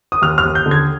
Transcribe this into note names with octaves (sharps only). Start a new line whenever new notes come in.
D#6
D#2 F6
F6
D#2
G6
D3
G#6